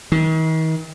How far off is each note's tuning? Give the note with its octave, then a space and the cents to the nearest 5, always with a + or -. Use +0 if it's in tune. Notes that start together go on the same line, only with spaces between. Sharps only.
D#3 +40